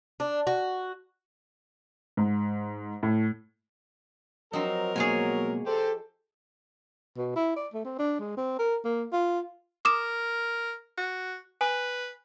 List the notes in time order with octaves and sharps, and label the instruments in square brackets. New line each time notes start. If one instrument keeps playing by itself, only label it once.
[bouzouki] D4
F#4
[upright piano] G#2
A2
[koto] F3 C4 D#4 [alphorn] F#3 [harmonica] A#4
[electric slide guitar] B2 G#3 A#3 [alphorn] F#3 [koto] G#4 C#5 G#5
[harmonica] G4 C5 [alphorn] A4
[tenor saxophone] B2
E4
D5
A3
C4
D4
G#3
C4
A#4
A#3
F4
[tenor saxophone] A#4 [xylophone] D6 D#6 E7
[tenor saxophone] F#4
[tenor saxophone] B4 [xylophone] G#5